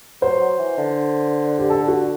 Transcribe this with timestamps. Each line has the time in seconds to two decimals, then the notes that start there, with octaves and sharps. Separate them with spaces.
0.22 F#3 C5
0.40 F#3
0.58 E3
0.77 D3
1.59 G4
1.70 A4
1.88 F#4